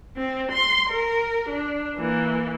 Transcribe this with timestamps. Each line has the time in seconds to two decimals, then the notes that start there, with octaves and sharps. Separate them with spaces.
0.17 C4
0.52 C6
0.90 A#4
1.49 D4
1.97 E3 A#3